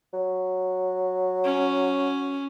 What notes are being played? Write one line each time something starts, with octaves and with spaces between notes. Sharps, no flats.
F#3
C#4